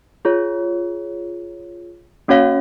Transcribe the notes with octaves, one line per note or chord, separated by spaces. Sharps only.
F4 G#4 C#5
A#3 C#4 F#4 C#5 F5